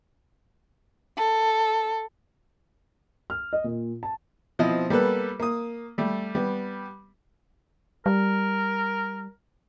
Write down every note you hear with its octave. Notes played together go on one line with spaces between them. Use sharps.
A4
F6
D#5
A#2
A5
B2 F3 C4 E4 D#5
G3 A#3 B3 A4 B4
A#3 D#6
G3 A3
G3 B3
G3 A#4